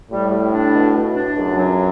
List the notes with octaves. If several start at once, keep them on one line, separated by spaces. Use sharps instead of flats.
A2 G3
G3
D4
B2
B2
D4
C#2 F#2
F#3